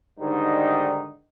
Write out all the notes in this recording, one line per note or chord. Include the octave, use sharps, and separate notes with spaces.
G#2 D3 D#3 G3 D#4